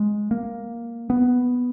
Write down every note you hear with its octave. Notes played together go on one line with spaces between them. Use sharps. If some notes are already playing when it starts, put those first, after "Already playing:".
Already playing: G#3
A#3
B3